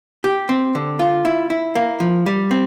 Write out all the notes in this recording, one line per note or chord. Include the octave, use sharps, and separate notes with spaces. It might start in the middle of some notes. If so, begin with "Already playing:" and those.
G4
C4
D3
F4
E4
E4
A#3
F3
G3
C4